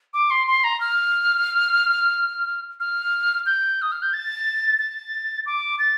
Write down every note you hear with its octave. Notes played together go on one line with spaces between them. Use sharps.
D6
C6
C6
A#5
F6
F6
G6
D#6
F6
G6
A6
A6
D6
A6